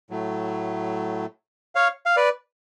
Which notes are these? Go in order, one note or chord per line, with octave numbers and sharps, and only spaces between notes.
A2 F#3 A3
C#5 F5
F5
B4 D5